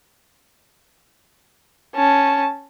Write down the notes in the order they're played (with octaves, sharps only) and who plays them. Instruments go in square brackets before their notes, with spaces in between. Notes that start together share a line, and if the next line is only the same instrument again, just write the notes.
[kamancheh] C#4 A5